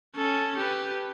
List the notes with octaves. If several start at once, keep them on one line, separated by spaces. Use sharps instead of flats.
C#4 A4
G4 B4